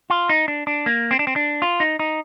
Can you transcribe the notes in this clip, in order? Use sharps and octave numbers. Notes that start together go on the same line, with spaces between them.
F4
D#4
D4
D4
A#3
C4
D4
C4
D4
F4
D#4
D#4